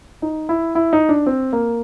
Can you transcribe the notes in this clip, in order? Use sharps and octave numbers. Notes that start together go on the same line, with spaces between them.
D#4
E4
E4
D#4
D4
C4
A#3